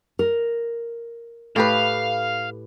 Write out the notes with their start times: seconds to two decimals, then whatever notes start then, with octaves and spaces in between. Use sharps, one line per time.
0.19 A#4
1.56 A2 G4 B4 F5